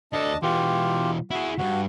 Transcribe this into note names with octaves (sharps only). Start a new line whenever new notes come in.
D2 D4 A4 D#5 A5
B2 E3 F4 G4
E4 F#4 G#4
D2 G2 F#4